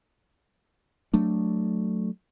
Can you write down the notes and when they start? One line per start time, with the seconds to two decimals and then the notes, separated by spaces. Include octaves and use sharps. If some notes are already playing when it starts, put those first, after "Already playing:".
1.14 F#3 A3 D4